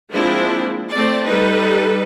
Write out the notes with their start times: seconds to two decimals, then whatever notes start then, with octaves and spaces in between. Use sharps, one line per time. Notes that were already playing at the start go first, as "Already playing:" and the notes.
0.13 F3 G#3 A#3 C4 D4 E4
0.92 A3 C4 D5
1.26 G3 D#4 A4 B4